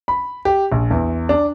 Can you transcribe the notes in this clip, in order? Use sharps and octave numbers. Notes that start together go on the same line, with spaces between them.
B5
G4
A#1
E2
D4